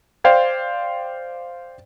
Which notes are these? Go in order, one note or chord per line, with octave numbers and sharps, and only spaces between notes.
C5 D5 F5 G5 G#6